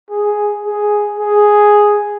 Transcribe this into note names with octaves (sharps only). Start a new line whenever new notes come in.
G#4
G#4
G#4